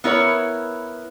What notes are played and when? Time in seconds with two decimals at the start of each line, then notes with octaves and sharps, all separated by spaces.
0.04 B3 E4 A#4 C#5